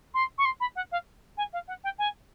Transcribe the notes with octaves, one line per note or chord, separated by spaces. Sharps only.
C6
C#6
C6
B5
F#5
F5
G#5
F5
F#5
G5
G#5